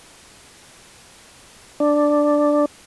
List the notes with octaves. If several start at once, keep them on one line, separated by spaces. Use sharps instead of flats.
D4